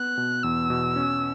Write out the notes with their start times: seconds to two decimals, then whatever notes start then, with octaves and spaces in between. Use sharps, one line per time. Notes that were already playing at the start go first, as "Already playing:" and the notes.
Already playing: B3 F#6
0.18 B2
0.43 E2 E6
0.70 B2
0.96 C#4